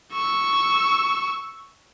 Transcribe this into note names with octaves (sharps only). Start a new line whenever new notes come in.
C#6 E6